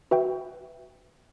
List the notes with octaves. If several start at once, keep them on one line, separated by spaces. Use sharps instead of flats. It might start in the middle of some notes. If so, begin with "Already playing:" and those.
F#4 B4 E5 G5